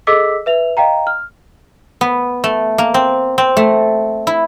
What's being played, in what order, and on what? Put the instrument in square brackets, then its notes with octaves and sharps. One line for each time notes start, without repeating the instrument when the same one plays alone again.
[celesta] G#4 A4 D#5 D6 E6 B6
B4 E5 F7
D#5 F5 G5 A#5
F6
[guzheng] B3
A3
A#3
C4
C4
A3
E4